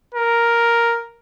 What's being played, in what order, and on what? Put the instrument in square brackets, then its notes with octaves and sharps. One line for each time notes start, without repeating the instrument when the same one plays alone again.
[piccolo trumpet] A#4